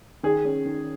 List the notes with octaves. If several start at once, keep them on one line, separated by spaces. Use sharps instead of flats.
D#3 G#4
C#4
D#3